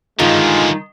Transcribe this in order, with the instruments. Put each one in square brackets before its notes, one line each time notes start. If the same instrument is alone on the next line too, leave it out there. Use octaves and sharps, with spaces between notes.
[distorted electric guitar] G2 D3 [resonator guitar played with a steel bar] D#3 [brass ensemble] G#3 F4